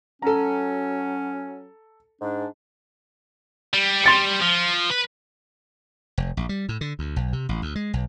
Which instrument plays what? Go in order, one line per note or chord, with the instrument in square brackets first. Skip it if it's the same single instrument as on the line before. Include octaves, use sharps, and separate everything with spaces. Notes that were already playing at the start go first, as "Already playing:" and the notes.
[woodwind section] F#3 C#4 [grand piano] A4 A#5
[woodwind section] G#2 D4
[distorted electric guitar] G3
[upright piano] C6 A6 C#7
[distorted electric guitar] F3
B4
[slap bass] F1
A#1
G3
A2
D3
D2
B1
C3
A1
D2
G#3
B1